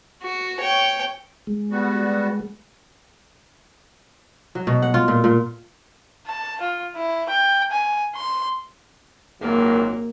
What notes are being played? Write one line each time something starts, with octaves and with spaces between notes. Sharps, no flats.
F#4
C#5 G5
G#3
G3 B3 F#4
F#3
B2
F#5
F4
A#2
A#2
A5
F4
E4
G5
G#5
C6
G#1 A#2 F#3 A#3